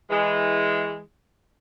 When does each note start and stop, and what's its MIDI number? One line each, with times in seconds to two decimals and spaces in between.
0.10 1.00 52
0.10 1.00 56